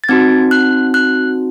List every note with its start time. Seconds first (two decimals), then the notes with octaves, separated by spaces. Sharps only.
0.04 A6
0.09 C4 D#4 F#4 G#6
0.51 F#6
0.94 F#6